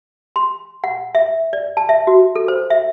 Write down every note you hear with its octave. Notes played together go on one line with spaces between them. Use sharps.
C6
F#5
E5
D5
A5
E5
F#4
A4
C5
E5